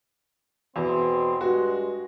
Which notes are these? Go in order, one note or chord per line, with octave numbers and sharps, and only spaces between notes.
E2 B2 C4
G2 G#3 F#4